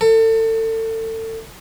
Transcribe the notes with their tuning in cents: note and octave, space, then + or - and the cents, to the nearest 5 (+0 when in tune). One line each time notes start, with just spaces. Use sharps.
A4 +30